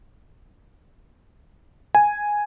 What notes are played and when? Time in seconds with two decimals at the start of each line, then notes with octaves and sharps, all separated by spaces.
1.95 G#5